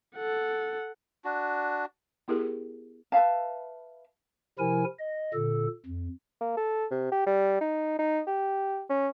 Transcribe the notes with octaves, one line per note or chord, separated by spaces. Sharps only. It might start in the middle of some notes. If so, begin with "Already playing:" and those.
A4 F#5
D4 F#4
B3 E4 G4 G#4 A#4
B4 E5 F5 A5
C3 F3 E4 A#4 G#5
D#5
A#2 D3 A4
F2
A#3
A4
C3
G4
G3
D#4
D#4
G4
C#4